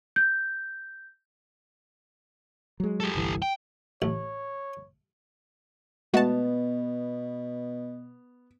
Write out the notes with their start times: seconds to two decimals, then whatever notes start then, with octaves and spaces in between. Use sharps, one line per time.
0.16 G6
2.80 F#3 G#3
3.00 G4 A4
3.15 G1 C2 E3
3.42 G5
4.02 A1 C#5
6.14 B2 G#3 A3 B3 F#4 A5